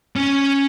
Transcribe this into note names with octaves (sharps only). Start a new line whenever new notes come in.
C#4